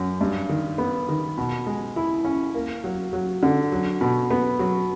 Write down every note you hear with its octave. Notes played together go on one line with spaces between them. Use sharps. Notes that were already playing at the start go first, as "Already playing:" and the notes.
Already playing: F#2
G2
D#3
B3
D#3
B2
G#3
E4
C#4
A#3
F#3
F#3
D3
F#3
B2
B3
F#3